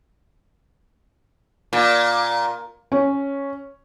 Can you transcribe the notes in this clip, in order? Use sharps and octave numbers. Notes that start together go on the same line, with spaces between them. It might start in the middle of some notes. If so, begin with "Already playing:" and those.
A#2
C#4